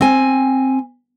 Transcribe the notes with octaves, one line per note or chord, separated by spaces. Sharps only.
C4 G#5